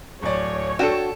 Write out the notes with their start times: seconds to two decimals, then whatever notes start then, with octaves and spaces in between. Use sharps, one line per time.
0.23 D1 C#5 D5
0.79 D4 F#4 A4 G5 E7